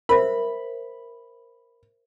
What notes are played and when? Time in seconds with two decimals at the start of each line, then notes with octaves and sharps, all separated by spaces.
0.09 A#4 C5 E5 B5